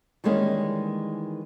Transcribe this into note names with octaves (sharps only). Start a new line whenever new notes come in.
D#3 E3 G3 G#3 A#3 C#4